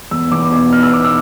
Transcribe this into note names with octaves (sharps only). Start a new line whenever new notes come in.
E2 E6
E2 D6
B2 D6
B2 F6
E6
B2 D6
E6